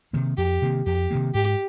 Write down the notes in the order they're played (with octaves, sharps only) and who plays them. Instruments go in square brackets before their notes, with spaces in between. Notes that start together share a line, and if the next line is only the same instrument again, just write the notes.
[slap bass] C3 D#3 A#3
[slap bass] F2 [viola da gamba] G4
[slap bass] C3 D#3 A#3
[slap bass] F2 [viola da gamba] G4
[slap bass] C3 D#3 A#3
[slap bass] G#2 [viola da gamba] G4